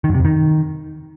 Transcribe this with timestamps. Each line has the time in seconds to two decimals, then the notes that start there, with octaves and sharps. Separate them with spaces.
0.04 D#3
0.09 F#2
0.14 C3
0.20 F2
0.25 D#3